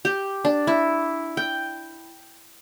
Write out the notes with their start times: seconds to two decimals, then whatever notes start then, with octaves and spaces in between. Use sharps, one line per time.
0.05 G4
0.45 D4
0.67 E4
1.37 G5